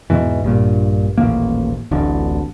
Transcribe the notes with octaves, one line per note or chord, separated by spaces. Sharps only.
E2 G#2 B2 E3
A#1 G2 A#2
D#1 A1 A#2 A#3
D1 A1 D3